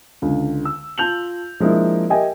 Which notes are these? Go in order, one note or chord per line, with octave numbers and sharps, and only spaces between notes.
C#2 D3
E6
F4 A5 G6 F7 F#7
F3 G#3 A#3 D4 E4
G4 A#4 D#5 E5 G5 G#5